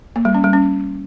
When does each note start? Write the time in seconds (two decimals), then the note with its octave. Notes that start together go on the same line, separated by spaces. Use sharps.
0.16 A#3
0.25 G3
0.34 C#4
0.44 G3
0.53 C#4